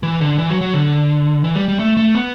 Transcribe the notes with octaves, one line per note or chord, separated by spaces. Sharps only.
E3
D3
E3
F#3
F#3
D3
E3
G3
G3
A3
A3
B3